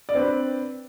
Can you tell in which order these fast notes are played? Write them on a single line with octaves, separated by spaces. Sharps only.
D5 D4 C4 B4